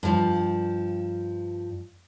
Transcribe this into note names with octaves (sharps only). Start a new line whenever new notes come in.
G2 F3